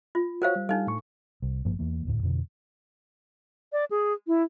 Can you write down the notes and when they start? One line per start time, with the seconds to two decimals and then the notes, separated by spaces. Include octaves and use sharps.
0.15 F4
0.42 F#4 A#4 C5 C#5 F5
0.56 G3
0.69 G3 D4 D#4 A4 F5
0.87 A2 C#6
1.42 C2
1.65 G#1 G2 F3 A#3
1.79 E2 E3 A#3
2.05 E1 D2 A2
2.23 F2 B2 D3
3.72 D5
3.91 G#4
4.27 E4